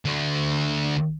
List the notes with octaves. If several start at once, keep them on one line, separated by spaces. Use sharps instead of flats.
D2 D3